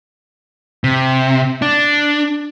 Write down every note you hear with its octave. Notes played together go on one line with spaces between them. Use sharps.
C3
D4